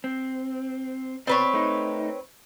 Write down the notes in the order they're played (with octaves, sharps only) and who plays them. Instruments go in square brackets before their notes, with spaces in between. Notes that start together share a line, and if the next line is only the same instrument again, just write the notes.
[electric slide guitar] C4
[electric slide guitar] B2 D5 [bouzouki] C4 B4 C#5
[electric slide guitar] A3 D#4